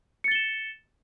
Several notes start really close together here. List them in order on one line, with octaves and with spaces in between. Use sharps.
C#7 A6 G7 E7